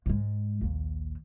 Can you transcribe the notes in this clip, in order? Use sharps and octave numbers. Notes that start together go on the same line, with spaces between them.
G#2 G#3
A#1 D#2